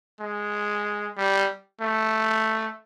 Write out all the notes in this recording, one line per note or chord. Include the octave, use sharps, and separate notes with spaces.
G#3
G3
A3